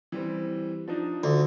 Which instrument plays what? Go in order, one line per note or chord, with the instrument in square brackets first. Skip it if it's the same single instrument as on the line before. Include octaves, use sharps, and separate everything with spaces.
[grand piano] E3 G3 C4
F3 D4 D#4
[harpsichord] D2